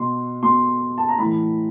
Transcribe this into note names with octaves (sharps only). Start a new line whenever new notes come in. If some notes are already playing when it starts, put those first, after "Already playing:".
Already playing: B2 C6
B2 C6
A5
A#5
A2 E3 B5